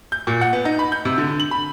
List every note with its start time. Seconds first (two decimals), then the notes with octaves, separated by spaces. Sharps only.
0.12 G6
0.27 A#2
0.41 F#5
0.53 B3
0.65 D#4
0.79 B5
0.92 G6
1.05 C3
1.18 D3
1.40 F#7
1.51 B5